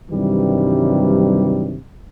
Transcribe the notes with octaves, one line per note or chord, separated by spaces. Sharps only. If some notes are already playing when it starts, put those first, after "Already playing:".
G2 C3 D#3 E3 F#3 G3